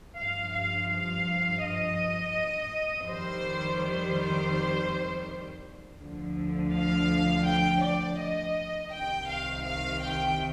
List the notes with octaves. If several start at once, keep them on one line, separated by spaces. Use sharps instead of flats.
G2 F3 F5
F5
F5
D#5
F2 D#3 G3 C5
C5
D2 D3 F3
F5
G5
D5
D#5
C2 C3 D#3 G5
F5
F5
G5